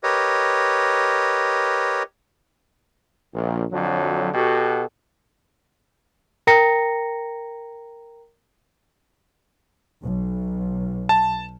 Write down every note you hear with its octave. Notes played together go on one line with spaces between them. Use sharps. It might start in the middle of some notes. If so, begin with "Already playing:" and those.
G4 A#4 B4 C#5 D#5
A#1
F2 D3 F#3
B2 F#4 G4 A4
A#4 G5 A#5 A#6 C#7
B1
A5